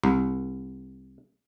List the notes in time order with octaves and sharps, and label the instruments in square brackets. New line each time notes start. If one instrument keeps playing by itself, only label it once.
[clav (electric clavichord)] C2